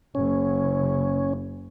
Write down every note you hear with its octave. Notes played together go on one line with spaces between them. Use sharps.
F#1 C#4